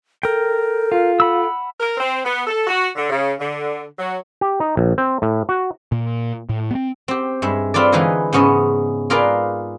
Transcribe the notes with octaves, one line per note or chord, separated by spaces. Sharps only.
A4 A#4 G5
F4
F#5 B5 E6
A#4
C4
B3
A4
F#4
D3
C#3
D3
F#3
G4
D#4
A#1
C4
A2
F#4
A#2
A2
B3 C4
C4 G4
G2 G#3 E5
C4 F4 A4 B4 D5
D3 E3 G#3 D#4 G#4 B4
G#2 C#3 B3 C#4 D#5 E5
F4 G#4 A#4 B4 D5 F5